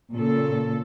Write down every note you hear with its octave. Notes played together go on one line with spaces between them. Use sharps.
A#2 C#3 A4